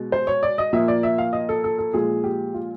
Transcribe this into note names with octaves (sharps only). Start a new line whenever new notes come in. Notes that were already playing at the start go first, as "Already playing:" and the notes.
Already playing: B2 G#3
C5
C#5
D5
D#5
A#2 F3 A#3 E5
D5
E5
F5
D#5
A4
A4
A4
A#2 F3 G#3 G#4
G4
F4